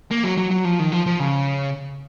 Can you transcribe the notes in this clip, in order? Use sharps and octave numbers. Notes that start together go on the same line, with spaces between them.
A#3
F#3
F#3
F#3
F3
D#3
F3
F3
C#3